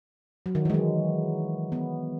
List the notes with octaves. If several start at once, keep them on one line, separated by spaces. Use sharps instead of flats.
F#3
D#3
E3
G#3
F#3
B3